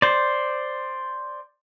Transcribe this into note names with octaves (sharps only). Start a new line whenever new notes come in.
C5 D5